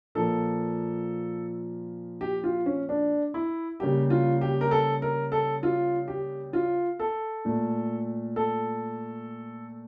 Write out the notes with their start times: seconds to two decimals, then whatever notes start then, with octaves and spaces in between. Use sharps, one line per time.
0.15 A#2 F3 A#3 A4
2.21 G4
2.44 F4
2.66 C#4
2.89 D4
3.34 E4
3.80 C#3 G3 A#3 G4
4.10 F4
4.41 G4
4.61 A#4
4.71 A4
5.02 A#4
5.32 A4
5.63 F4
6.08 G4
6.53 F4
7.00 A4
7.45 A#2 A3
8.36 A4